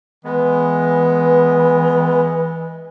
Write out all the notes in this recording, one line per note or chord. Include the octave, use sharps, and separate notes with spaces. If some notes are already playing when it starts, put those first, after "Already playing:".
E3 G#3 B3